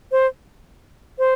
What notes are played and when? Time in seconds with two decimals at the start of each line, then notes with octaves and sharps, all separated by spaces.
0.12 C5
1.19 C5